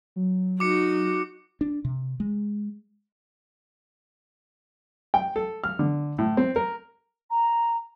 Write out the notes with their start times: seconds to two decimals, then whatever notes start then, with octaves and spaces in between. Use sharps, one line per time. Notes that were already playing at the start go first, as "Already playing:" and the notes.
0.16 F#3
0.60 D#4 F#4 D6 C#7
1.61 D4
1.85 C3
2.20 G#3
5.14 G5
5.36 A4
5.64 F6
5.79 D3
6.18 A2
6.37 C4
6.56 A#4
7.30 A#5